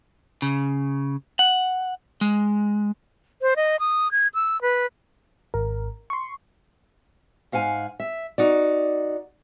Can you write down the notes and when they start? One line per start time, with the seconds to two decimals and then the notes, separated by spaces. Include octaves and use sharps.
0.42 C#3
1.39 F#5
2.21 G#3
3.42 C5
3.56 D#5
3.80 D#6
4.11 G#6
4.34 E6
4.62 B4
5.54 G#1 A#4
6.10 C6 C#6
7.52 G#2 F5 F#5 G#5
8.00 E5
8.38 D#4 F#4 D5